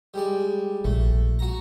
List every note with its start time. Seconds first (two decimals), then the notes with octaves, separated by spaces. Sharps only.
0.14 G3 G#3 D5
0.84 A#1 A3
1.39 F#4 A#5